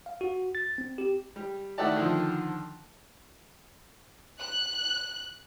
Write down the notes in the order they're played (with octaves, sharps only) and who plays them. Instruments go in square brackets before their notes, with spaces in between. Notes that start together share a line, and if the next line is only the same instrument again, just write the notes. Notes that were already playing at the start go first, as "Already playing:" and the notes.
[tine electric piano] F5
F#4
A6
C4
G4
[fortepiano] G3
D#3 A3 E4 F#4 D5 A5
D3 D#3 F3
[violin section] F#6